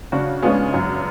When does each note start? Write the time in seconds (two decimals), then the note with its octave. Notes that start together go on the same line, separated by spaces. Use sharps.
0.12 C#3 D4 F#4
0.42 G#3 B3 C#4 D4 F4 G#4
0.74 F#2